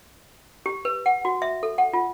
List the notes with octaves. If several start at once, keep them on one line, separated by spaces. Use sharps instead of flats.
G4
B4
F#5
F#4
E5
A4
F#5
F4